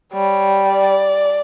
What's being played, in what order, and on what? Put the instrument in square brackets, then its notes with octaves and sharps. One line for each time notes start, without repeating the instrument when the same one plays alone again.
[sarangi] G3 [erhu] C#5
[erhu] D5